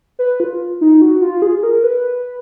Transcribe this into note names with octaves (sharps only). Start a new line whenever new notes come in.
B4
F4
D#4
F#4
F4
G#4
A#4
B4